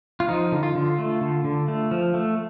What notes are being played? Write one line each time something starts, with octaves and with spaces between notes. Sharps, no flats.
F4
F3 D#4
D3
F4
D3
A3
D3
D3
A3
F3
A3